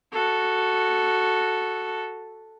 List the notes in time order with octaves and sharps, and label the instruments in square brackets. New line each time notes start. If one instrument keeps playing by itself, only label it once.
[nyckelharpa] F#4 A4